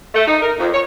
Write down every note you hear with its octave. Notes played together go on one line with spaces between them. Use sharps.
A3
D#4
A#4
F2
C#5